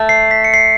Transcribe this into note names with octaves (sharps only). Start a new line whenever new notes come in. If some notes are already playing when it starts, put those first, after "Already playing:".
Already playing: A3
C7
B6
C#7
C7